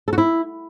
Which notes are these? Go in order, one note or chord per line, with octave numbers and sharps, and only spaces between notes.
A4
F#4
E4